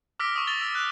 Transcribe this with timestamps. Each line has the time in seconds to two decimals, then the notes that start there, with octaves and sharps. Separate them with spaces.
0.20 D6 E6 F6 A#6 B6 D7
0.34 C#6 D#6 E6
0.47 A6 F7 G7
0.62 E6
0.75 F#6